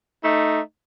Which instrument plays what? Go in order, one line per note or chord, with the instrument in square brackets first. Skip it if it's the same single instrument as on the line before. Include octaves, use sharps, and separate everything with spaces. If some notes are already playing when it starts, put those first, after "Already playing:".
[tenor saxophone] A3 [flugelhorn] D#4